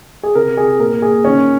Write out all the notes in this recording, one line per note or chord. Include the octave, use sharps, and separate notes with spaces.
G#4
C3 A#4
C3 G#4
A#2 A#4
A#2 G#4
D#3 C#4